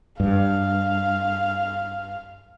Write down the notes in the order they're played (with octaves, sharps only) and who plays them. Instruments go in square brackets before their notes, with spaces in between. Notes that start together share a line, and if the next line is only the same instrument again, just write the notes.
[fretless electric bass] G2 [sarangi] F5